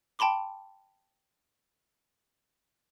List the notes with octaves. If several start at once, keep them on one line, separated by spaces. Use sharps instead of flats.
G5 A5 B5 C6 D6